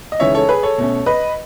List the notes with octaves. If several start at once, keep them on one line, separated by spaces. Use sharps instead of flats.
D#5
C#3 E3 G#3 D#4 C#5 E5
A4 C#5
G#4 B4
A4 C#5
B2 A3 C#4
B4 D#5